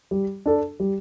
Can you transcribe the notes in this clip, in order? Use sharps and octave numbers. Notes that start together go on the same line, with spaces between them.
G3
D4 A4
G3